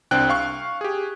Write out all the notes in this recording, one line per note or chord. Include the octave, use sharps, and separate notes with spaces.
C2 C4 D4 G5 F#6
F5 C#6 F#6
G4 G#4